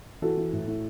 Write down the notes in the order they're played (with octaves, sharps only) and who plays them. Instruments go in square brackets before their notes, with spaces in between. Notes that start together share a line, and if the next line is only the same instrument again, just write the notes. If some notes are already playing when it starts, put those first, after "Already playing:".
[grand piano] E3 F#4 A4
E3
A2
A2